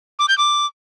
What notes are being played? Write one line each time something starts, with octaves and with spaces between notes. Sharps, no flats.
D6
G6
D6